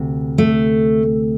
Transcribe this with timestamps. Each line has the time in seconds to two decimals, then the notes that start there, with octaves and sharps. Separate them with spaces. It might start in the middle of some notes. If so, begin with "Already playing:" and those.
Already playing: D2 C3
0.38 A3